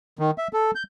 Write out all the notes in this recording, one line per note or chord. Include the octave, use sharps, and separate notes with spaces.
D#3
E5
A4
G6